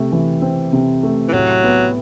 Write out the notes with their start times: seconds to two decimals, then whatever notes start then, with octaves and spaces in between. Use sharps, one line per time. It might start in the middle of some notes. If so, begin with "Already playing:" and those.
Already playing: C3 A3
0.12 E3
0.42 C4
0.73 C3
1.03 A3
1.28 E3
1.33 A2 F#3
1.64 B3